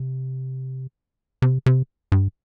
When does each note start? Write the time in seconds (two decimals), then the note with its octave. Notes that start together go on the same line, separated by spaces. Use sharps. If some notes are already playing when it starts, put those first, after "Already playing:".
Already playing: C3
1.42 C3
1.66 C3
2.12 G2